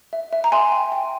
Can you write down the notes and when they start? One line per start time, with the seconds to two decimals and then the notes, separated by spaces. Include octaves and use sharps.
0.13 E5
0.33 E5
0.44 A#5
0.52 E5 G#5 C6
0.72 G5
0.92 G5